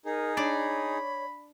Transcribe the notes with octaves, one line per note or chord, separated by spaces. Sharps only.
D#4 G#4 A#4
D4 C#5 D5 B5